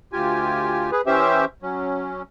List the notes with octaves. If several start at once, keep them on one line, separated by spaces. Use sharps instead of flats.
D2 F4 G4 G#5
G#4 B4
E3 C#4 G4 C5 E5
F#3 C#4